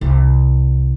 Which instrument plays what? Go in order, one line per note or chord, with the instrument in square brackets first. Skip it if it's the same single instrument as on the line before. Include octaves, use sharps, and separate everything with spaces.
[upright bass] C2